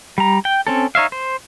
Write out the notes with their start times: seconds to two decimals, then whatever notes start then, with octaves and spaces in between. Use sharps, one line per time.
0.18 G3 A#5
0.45 G5
0.67 C4 C#4 A4
0.95 D#4 C#5 E5 F5
1.12 C5